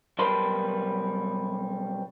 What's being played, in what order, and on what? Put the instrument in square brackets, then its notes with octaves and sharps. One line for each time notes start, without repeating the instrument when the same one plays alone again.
[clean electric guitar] B1 G3 A#4 B4 A5 C6